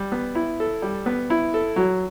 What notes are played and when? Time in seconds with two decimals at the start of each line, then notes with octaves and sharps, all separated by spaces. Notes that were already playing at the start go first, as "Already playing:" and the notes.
Already playing: G3
0.12 B3
0.35 E4
0.60 A4
0.82 G3
1.06 B3
1.30 E4
1.54 A4
1.76 F#3